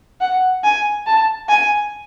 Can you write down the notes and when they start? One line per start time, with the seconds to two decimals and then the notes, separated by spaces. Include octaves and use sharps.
0.21 F#5
0.64 G#5
1.06 A5
1.49 G#5